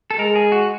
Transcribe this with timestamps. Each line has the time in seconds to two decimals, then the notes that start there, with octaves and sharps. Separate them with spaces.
0.11 A4
0.19 G#3 A#4
0.35 G#4
0.52 F#4